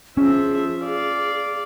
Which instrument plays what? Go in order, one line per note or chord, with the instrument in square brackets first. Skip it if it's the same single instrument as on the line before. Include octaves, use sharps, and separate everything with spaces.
[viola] F3 E5 [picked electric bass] C#4 [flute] G#4
[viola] D5 F5